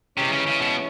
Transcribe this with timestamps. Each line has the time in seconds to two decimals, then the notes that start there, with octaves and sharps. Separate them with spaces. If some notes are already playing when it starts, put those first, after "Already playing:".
0.17 G2 C3 E3 G#3 C#4
0.32 C#3
0.47 C#3
0.61 B2